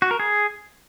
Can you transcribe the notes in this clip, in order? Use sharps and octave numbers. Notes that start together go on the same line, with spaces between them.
F#4
A#4
G#4